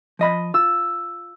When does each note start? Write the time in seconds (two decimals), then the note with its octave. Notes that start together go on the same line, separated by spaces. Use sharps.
0.19 F3 D#5 B5
0.54 F4 E6